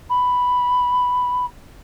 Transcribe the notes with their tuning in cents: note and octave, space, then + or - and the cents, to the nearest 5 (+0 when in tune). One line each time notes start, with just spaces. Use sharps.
B5 +0